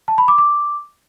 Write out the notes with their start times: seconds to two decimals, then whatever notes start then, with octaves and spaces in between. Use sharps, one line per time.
0.08 A5
0.18 B5
0.28 D6
0.38 D6